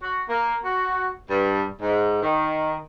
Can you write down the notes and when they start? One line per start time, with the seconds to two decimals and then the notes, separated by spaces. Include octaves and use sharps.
0.03 F#4
0.28 A#3
0.64 F#4
1.30 G2
1.81 G#2
2.22 D#3